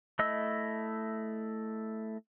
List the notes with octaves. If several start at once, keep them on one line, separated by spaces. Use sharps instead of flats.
A3 E4 D#5 E6